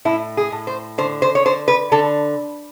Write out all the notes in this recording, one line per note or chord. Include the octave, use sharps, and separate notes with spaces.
A2 E4
G#4
A2
C5
D3 C5
C5
C#5
D3 C5
B4
D3 A4